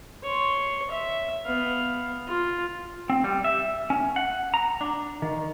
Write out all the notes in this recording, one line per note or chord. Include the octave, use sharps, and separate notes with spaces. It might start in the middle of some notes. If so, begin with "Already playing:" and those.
C#5 C6
E5
B3 F5
F4
C4
G3
E5
C#4
F#5
A#5
D4
D#3